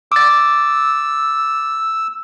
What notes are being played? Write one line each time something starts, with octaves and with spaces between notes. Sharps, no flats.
D6 E6 A6